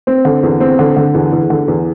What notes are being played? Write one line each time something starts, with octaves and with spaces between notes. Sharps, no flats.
C4
D3
E2
C4
D3
D3
E2
E2
D3
E2